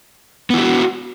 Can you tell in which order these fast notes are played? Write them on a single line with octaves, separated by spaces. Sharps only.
B3 E4 G4 F#4